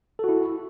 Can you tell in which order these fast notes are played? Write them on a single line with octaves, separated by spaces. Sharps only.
A4 F#4 E4